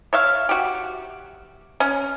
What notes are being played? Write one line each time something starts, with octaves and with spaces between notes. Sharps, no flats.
C#5 E5 F5
F#4 G4
C#4